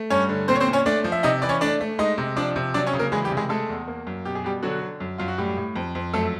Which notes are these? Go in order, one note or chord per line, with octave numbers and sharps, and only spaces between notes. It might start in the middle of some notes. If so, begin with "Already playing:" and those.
Already playing: A3
G2 C#4 C#5
D3
A#2 C4 C5
C#5
C4 C5
A#2
C#4 C#5
A3 D4 D5
F3
E5
C3 D#4 D#5
E3 D5
C#4 C#5
A3 D4 D5
A3
G#3 D#4 D#5
C3
F3 D4 D5
C3
F#3 D4 D5
C#4 C#5
C#3
A#3 A#4
E3 G#3 G#4
G3 G4
C3
G#3 G#4
G#3 A3 A4
E2
A#3
F#2
B2 G4
G#4
B2 G3 G4
D3 F#3 F#4
D3
F#2
F#2 F4
F#4
A2 G3 G4
A2
F2
F2
F#2 A3 A4